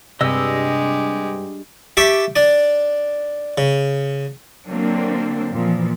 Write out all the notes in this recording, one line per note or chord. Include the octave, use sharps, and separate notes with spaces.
G2 C3 G#3 G4 D#5 E6
G4 E5 A5 C#6 D6
D4 D5
C#3
D3 F#3 A#3 C4 D4
A#2 E3 F3